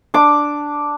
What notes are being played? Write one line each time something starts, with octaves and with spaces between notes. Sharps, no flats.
D4 D6